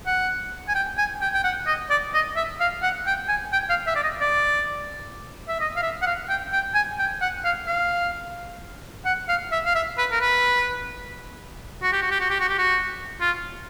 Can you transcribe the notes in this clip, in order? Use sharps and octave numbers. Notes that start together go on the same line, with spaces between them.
F#5
G#5
G5
G#5
G5
G5
F#5
D#5
D5
D#5
E5
F5
F#5
G5
G#5
G5
F5
E5
D5
D#5
D5
E5
D#5
F5
E5
F#5
F5
G5
G5
G#5
G5
F#5
F5
F5
F#5
F5
E5
F5
E5
B4
A#4
B4
F#4
G4
F#4
G4
F#4
G4
F#4
G4
F#4
F4